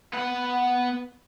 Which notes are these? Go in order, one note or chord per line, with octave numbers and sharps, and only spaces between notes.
B3 F#5